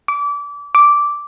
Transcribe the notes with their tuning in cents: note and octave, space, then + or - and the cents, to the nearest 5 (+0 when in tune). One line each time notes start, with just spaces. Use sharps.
D6 -30
D6 -10